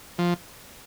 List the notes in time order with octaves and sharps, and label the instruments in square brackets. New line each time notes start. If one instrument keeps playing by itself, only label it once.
[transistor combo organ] F3